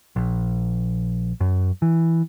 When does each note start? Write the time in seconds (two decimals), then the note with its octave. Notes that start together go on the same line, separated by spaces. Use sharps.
0.16 A#1
1.41 F#2
1.82 E3